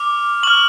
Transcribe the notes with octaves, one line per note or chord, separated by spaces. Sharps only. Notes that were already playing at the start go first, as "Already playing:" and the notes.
Already playing: D6 F6
C#6 F6 F#7